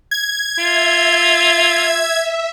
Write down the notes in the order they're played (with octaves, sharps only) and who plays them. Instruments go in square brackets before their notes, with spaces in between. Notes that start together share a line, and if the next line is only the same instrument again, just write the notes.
[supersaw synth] G#6
[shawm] F4 [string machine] E5